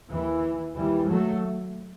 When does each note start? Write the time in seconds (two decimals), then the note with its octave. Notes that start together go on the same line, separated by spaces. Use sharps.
0.11 D#2 E3
0.76 D#2 E3 G3
1.08 F#3 A3